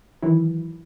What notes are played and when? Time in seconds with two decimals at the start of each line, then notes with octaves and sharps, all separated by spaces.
0.23 D#3 E3 F#3 E4